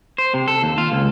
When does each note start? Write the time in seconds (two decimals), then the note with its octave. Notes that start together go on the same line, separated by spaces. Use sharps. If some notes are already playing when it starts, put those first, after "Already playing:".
0.18 C5
0.34 C3
0.48 A4
0.63 D#2
0.78 F4
0.92 C#2